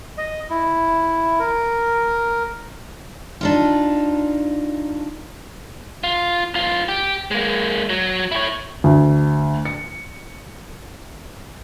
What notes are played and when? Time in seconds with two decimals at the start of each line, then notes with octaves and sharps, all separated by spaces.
0.18 D#5
0.50 E4
1.40 A#4
3.41 D4 D#4 F4
6.03 F4
6.54 B1 F4
6.88 G4
7.31 G#3 A#3
7.90 F#3
8.31 E4 C#5
8.84 D2
9.65 C#7